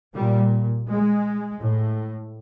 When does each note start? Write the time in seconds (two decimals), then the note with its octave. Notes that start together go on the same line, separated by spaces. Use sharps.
0.14 A#2 G3
0.88 G#3
1.61 A2